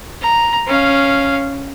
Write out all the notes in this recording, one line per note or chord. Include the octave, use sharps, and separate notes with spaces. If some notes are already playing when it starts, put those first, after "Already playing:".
A#5
C#4 F5